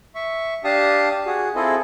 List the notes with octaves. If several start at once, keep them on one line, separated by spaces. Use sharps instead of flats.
E5 C#6
D4 G4 F5 A5 D#6
F#4 G#4
C4 E4 F4 G#4 A4 D#5